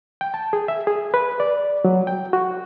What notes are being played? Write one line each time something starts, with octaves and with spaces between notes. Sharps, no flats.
G5
A5
G#4
E5
G#4
B4
D5
F#3
G5
F#4